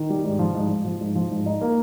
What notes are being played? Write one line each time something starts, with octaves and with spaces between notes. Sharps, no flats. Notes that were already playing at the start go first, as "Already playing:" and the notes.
Already playing: D#3
G3
G#2
F3
G#2
G#2
F3
G#2
F3
G#2
D#4
A#3